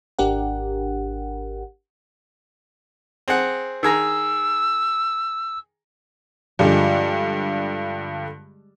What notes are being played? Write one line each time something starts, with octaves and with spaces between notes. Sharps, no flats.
G#1 D4 G4 A#4 F#5
C4 G#4 F#5
D#3 G#4 A#5 E6
G2 D3 F3 G3 G#3 G4